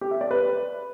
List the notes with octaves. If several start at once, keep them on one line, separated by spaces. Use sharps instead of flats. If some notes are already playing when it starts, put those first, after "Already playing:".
G4
E5
D5
B4